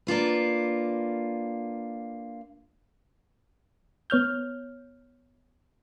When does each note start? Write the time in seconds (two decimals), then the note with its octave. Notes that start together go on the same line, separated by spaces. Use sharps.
0.07 A#3 D4 F4 B4
4.10 B3 C#5 F6 G6